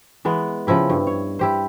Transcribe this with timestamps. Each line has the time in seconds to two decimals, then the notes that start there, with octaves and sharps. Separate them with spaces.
0.25 E3 G#3 B3
0.67 C#3 F3 E4 G4
0.90 G2
1.07 C#5
1.39 E4 G4 C5